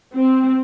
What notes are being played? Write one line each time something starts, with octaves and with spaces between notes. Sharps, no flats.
C4